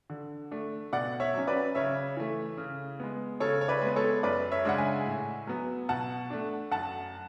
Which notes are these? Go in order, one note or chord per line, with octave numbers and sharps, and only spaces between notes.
D3
A3 D4
B2 D5 F#5
C#5 E5
F#3 C#4
B4 D5
C#3 C#5 E5
E3 A3
C#3
G#3 B3
C#3 A4 C#5
C#5
B4 D5
G#3 B3
A4 C#5
F#2 B4 D5
C#5 E5
C#3 G#3 D4 F#5
E5 G#5
A2
F#3 B3
B2 F#5 A5
A3 D4
F#2 F#5 A5